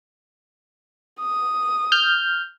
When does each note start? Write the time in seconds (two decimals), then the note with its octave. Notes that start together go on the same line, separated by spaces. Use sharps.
1.20 D#6
1.92 F6 G6